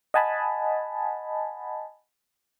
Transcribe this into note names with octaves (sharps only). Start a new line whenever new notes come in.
D#5 F#5 G#5 A5 B5